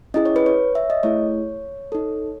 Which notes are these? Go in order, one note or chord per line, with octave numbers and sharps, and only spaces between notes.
C#4 E4 G#4 D#5
C#5
B4
C#5
E5
D#5
A3 E4 G#4 C#5
D#4 A4